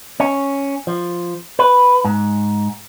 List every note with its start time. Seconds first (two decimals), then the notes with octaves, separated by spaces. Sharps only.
0.20 C#4
0.87 F3
1.59 B4
2.05 G#2